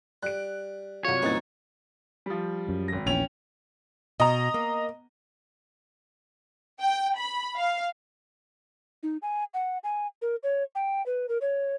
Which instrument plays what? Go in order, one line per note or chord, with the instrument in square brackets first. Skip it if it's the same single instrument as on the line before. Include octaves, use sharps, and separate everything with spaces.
[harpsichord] G3 [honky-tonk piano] F#6 D7
[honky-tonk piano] C2 F#3 F4 [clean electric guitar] C#5
[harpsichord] C2 E3 D#4 [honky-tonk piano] F#2 A#2 A6
[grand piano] F3 G3
[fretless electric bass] F#2
[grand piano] G#1 A#6
[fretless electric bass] A#1 E2 [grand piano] C#4 G5 F7
[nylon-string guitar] B2 [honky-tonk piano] D#5 A#5
[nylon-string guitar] A#3
[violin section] G5
B5
F5
[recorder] D#4
G#5
F#5
G#5
A#4
C#5
G5
B4
A#4
C#5